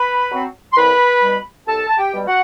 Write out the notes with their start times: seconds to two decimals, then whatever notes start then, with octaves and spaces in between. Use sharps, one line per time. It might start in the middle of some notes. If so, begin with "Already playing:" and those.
Already playing: B4 B5
0.31 F#3 C4
0.73 C6
0.76 C2 B4 B5
1.22 B2 G3
1.67 C2 A4 A5
1.89 A5
1.97 G4 G5
2.13 B2 G3
2.27 F#4 F#5